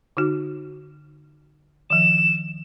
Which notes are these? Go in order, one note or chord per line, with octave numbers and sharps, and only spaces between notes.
D3 D#4 F#4
D#3 F3 E7